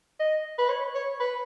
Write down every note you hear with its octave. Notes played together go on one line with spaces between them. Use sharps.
D#5
B4
C#5
C#5
B4